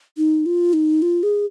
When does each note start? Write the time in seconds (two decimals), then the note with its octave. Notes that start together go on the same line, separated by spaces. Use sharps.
0.17 D#4
0.46 F4
0.73 D#4
1.02 F4
1.23 G#4